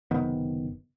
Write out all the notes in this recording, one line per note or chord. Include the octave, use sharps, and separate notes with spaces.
F#1 C3 D#3 B3